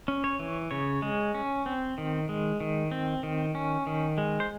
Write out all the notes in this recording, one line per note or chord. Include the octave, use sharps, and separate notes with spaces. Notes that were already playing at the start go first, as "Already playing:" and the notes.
C#4
C#5
E3
C#3 C#5
G#3
C#4
C4
D#3
G#3
D#3
C4
D#3
C#4
D#3
G#3
C5